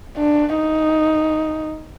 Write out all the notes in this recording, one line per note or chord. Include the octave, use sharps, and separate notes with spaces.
D4
D#4